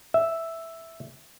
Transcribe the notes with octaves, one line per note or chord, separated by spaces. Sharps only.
E5